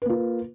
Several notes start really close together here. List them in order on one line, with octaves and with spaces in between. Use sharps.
B4 A#3 F4